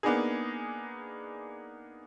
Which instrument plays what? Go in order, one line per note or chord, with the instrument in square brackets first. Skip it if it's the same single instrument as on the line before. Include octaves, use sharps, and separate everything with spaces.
[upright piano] A#3 B3 D4 D#4 G#4